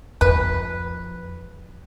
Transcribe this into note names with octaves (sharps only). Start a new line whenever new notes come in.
F2 B4